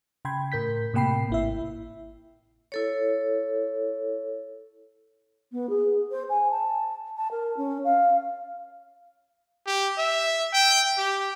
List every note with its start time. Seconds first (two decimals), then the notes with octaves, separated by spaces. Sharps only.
0.25 C#3 G5 B5 C6 G#6
0.52 A2 A#4 G6 B6
0.94 A2 C3 A#3 G5 B5 C7
1.30 G#1 E4 E5
2.72 E4 A4 C#5
5.52 B3
5.69 G#4
6.11 C5
6.29 G#5
6.51 A5
7.17 A5
7.31 A#4
7.57 C#4
7.84 F5
9.67 G4
9.98 E5
10.53 G5
10.98 G4